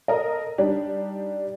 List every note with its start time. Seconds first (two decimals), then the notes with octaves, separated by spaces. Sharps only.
0.08 A4 A#4 D#5
0.58 G3 D4 D#4 G4